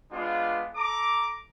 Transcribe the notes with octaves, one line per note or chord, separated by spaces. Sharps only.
G#3 B3 D4 F4
A4 A#5 D6